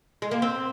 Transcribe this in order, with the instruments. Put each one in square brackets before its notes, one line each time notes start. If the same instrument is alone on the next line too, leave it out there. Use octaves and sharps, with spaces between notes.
[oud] G#3
A#3
C4